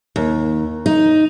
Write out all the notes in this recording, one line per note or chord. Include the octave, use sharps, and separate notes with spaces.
D#2
D#4